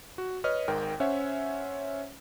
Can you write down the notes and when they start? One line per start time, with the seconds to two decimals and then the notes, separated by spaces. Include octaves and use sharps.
0.18 F#4
0.44 B4 C#5 D#5 F6
0.68 G#1 G#2 A#4 G5
1.00 C#4 C5 C#5 E5 F#5 G#5